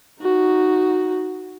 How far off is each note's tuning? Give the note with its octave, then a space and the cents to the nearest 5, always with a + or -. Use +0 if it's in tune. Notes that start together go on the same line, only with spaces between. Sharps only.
D#4 +0 F#4 +0